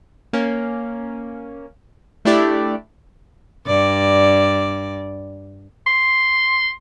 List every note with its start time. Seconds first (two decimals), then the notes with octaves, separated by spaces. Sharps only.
0.33 A#3 C#4
2.25 A3 D4 E4 G4 D5
3.66 G2 D5
5.87 C6